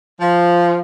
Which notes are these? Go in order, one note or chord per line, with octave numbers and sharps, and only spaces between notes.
F3